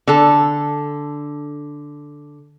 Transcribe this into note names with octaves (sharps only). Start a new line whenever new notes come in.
D3 A4